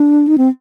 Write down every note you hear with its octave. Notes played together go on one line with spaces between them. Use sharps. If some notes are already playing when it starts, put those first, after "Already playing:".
Already playing: D4
D#4
C4